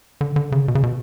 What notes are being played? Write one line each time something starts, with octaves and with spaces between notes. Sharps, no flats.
D3
D3
C#3
B2
C#3
B2